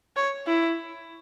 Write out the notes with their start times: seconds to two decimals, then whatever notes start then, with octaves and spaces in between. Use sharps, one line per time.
0.16 C#5
0.47 E4